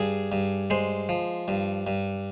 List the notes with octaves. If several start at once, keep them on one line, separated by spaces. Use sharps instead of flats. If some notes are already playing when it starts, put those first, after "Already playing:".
Already playing: G2 G#4
G2
G#3 C5
F3
G2
G2